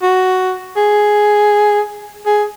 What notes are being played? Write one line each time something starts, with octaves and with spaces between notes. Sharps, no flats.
F#4
G#4
G#4